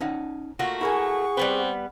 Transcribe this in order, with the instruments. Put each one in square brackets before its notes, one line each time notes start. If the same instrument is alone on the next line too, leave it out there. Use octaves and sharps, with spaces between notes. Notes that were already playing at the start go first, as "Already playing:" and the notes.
[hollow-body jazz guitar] C#4 D#4 F#5
[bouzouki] A3 A#3 F#4 [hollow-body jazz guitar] F4
[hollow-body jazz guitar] E4 A#4 G#5 [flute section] G#4 F#5 C#6
[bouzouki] G3 B3 B4 [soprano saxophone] C4